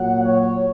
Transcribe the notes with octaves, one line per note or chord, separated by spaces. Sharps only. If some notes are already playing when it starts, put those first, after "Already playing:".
Already playing: A#2 F#3 F#5
C#5